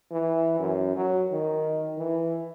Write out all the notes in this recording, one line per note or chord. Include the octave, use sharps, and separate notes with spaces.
E3
F#2
F#3
D#3
E3